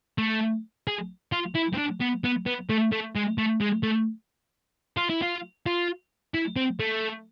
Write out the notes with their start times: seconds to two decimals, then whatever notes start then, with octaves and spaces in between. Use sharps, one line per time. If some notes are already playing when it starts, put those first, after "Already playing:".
0.18 A3
0.87 G#4
1.32 F4
1.55 E4
1.74 C4
1.78 D4
2.01 B3
2.24 B3
2.46 B3
2.69 A3
2.92 A3
3.16 G#3
3.38 A3
3.61 G#3
3.83 A3
4.97 F4
5.10 E4
5.22 F4
5.66 F4
6.34 E4
6.56 C4
6.80 A3